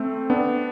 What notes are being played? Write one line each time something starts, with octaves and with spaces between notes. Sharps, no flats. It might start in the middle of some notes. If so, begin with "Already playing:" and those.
Already playing: A3 C4
B3 D4